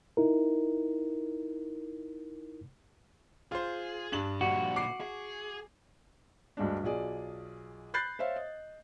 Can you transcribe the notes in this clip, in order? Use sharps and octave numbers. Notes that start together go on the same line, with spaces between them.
D#4 E4 A#4
F4 G#4 C5
G2 D4 F#7
A#2 D3 G3 F#4
D6 C7
G#4
D2 G2 G#3 D4
B1 F4 G#4 D5
B5 F#6 G6 A6 C7
C5 C#5 E5 F5
D#5